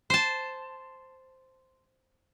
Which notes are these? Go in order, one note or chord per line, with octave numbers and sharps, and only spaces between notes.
C5 A5